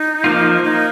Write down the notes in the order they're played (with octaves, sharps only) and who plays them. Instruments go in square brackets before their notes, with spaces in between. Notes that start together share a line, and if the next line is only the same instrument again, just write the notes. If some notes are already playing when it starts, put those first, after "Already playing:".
Already playing: [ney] D#4
[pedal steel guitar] F3 A#3 F4
[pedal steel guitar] A#3 [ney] D#4